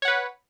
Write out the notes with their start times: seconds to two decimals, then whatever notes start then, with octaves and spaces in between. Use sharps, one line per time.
0.02 C#5
0.05 F#5
0.08 B4